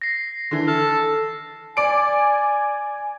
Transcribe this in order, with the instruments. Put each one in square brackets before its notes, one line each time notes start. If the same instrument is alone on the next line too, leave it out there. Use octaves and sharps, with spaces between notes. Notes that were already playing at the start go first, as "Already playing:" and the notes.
[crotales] A#6 C7
[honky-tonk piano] D3 E3
[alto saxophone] A4 [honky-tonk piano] F6
[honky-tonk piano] D5 D7 [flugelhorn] G#5